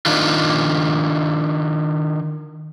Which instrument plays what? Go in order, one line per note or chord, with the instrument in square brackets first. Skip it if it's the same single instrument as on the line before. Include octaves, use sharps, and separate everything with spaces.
[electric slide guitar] D#3 D4 F4